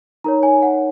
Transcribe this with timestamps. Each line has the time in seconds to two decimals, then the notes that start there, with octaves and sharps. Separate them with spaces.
0.24 D#4 A#4 C#5 A#5
0.43 G#5
0.62 F#5